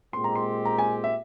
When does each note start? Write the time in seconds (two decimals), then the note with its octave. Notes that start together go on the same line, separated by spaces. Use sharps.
0.13 A#2 G#3 C4 G4 C6
0.24 A#5
0.35 C6
0.65 A#5
0.78 G#5
1.04 E5